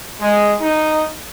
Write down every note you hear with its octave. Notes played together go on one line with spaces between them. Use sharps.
G#3
D#4